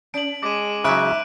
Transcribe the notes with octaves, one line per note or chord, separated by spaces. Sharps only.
C#4 D7 F#7
G#3 D6 D#7
G#2 C#3 F#3 D#4 E5 F#6 D7